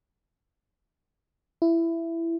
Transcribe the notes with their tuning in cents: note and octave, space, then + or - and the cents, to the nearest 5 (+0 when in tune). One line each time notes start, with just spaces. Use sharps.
E4 +15